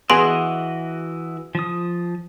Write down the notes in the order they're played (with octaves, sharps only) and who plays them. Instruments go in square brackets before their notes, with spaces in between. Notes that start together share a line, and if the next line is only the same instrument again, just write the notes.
[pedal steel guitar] E3 F#4 D#5 [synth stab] B3 G#4 [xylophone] C6 D7 F7
[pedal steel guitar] F3 D#6